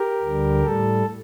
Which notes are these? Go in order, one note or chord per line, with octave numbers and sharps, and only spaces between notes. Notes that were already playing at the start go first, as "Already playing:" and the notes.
Already playing: G4 A#4
D2 D3 G3
A2 G3 A4